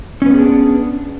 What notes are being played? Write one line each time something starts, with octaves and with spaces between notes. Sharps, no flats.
B3 C#4 D4 G#4 B4